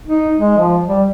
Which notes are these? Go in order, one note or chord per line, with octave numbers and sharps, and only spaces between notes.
D#4
G#3
F3
G3